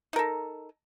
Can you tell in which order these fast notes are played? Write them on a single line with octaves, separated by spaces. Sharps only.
D#4 A#4 A4